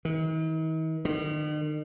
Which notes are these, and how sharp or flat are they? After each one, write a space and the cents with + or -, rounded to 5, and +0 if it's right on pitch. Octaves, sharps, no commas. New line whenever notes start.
D#3 +45
D#3 -45